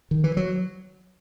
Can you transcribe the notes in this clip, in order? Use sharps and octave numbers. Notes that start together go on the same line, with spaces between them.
D#3
E3
F#3